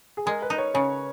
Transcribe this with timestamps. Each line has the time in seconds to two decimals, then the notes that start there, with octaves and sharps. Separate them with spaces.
0.17 G#4
0.26 G#3 A#4
0.42 B4
0.50 D#4
0.58 C#5
0.74 C#3 C#5